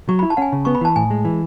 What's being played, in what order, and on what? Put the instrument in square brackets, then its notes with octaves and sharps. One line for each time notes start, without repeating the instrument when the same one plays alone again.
[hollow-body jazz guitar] F#3 [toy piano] C#6
[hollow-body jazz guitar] E4 [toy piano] B5
[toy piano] A5
[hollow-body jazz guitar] C#4 [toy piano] F#5 G#5
[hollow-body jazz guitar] C#3
[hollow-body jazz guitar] B3 [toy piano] C#6
[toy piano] B5
[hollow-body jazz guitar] E3 [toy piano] A5
[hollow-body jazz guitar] A2 [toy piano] G#5
[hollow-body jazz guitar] G#3
E3